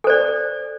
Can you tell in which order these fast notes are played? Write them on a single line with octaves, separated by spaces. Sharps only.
A4 C5 D5